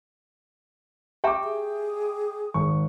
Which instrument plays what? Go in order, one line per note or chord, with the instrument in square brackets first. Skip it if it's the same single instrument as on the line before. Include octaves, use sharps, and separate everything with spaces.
[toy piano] G4 E5 A#5 [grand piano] G5 D6
[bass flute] G#4
[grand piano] G#1 C#6